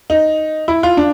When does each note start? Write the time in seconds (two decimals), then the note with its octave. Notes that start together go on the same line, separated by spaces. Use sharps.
0.10 D#4
0.68 E4
0.83 F4
0.97 D4